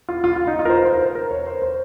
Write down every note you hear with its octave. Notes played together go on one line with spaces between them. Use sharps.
F4
F4
F4
D#4
F4
A#4
C5
C5
A#4
C5
A#4
C#5
C5
C5